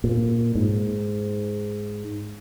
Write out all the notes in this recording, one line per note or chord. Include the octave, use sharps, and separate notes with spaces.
A#2
G#2